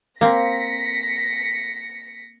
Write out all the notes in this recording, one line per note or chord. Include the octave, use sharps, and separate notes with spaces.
A#3 C4 A#6 B6 C#7